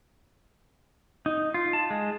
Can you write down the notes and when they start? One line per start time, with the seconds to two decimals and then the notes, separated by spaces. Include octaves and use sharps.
1.26 D#4
1.54 F4
1.73 A5
1.90 G#3